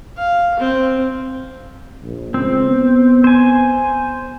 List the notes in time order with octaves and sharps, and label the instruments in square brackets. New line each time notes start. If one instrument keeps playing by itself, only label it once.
[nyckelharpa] F5
C4
[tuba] A#1
[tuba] C#2 [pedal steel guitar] C4
[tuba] B3
[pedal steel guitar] C5 G#5